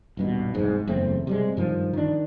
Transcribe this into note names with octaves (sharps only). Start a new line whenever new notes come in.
D#1 G2 B2
F1 C2 G#2
F#1 E2 A3 C4
C3 G3 G#3
G2 D#3 F3
D#3 D4